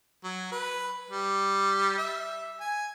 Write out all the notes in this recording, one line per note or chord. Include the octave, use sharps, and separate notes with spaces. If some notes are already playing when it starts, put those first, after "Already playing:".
F#3
B4
G3
E5
G#5